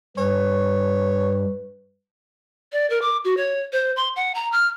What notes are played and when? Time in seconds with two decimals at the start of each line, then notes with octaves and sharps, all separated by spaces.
0.17 G2 B4 C#5
2.72 D5
2.90 A#4
3.02 D6
3.25 F#4
3.37 C#5
3.73 C5
3.96 C6
4.16 F#5
4.35 A#5
4.52 F6